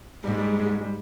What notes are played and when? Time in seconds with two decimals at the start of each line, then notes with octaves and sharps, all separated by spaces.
0.24 G#2 G3
0.31 G#3
0.38 G3
0.46 G#3
0.53 G3
0.60 G#3
0.66 G3
0.74 G#3
0.81 G3